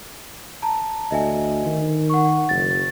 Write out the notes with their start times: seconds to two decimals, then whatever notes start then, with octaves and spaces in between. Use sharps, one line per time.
0.62 A5 A#5
1.11 D2 D#5 E5 G#5
1.66 D#3
2.10 F#5 C#6
2.49 F#1 A6